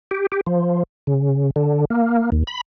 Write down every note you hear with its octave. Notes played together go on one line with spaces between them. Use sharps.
G4
G4
F3
C#3
D3
A#3
D#2
B5